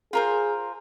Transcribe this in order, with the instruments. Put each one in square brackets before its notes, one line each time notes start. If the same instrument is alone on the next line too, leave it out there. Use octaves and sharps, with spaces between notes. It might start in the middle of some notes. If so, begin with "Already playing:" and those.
[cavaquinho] F4 A#4 C5 [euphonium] G#4